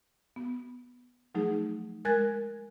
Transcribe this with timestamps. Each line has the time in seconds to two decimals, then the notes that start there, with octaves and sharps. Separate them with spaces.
0.36 B3
1.35 F3 F#3 A3 D#4 G#4
2.05 G#3 A#4 G#5 F#6 G#6 A6